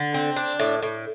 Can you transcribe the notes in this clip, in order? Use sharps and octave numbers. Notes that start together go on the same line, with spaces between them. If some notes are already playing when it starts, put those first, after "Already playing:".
Already playing: D3
C4
D4
A2
A2